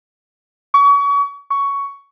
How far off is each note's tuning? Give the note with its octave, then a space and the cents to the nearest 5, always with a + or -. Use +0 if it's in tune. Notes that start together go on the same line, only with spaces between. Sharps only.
C#6 +35
C#6 +10